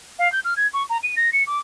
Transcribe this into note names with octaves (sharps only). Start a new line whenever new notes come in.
F5
G6
F6
G#6
C#6
A#5
D#7
A#6
C#7
D6